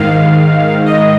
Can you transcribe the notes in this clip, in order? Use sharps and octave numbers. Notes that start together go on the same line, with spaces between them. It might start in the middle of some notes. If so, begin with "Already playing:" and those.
Already playing: G#2 D#3 F5
D#5